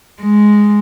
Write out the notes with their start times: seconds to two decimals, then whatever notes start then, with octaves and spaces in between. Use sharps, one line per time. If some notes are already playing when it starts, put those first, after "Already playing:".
0.22 G#3